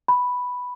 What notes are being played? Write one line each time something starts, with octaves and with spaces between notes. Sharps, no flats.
B5